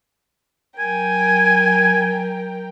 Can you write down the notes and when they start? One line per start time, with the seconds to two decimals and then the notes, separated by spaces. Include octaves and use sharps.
0.80 F#3 A#4 G5 G#5